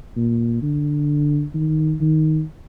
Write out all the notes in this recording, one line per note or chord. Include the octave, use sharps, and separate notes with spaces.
A#2
D3
D#3
D#3